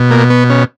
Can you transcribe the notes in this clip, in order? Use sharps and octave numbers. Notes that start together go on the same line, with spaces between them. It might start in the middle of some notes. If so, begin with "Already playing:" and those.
Already playing: B2
A#3
B3
C#4